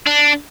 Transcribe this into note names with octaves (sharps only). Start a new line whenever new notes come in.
D4